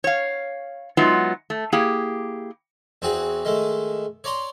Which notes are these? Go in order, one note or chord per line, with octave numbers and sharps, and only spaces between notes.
C#5 F5
F#3 G#3 B3 D#4 F4 E5
A3
A#3 E4 G4 G#4
E2 C4 F#4 G#4
D#3 G#3 A3
C#5 D5 A#5 C6